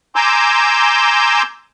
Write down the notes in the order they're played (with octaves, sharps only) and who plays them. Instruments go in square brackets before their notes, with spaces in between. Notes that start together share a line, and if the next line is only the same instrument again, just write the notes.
[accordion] G#5 A#5 C6 D6 E6 G6